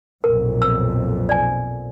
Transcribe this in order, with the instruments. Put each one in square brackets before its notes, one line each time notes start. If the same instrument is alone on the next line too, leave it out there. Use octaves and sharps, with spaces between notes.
[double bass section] B1 F2 A#2 [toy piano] A#4
[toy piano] E6
D5 G#5